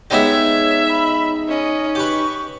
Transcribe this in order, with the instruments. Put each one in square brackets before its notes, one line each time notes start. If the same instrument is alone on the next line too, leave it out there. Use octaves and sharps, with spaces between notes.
[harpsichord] G#3 B3 G4 [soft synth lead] D#4 [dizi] C#5 [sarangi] E5
[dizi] B5
[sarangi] C#4 [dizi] D#5
[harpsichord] G4 B4 [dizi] C#6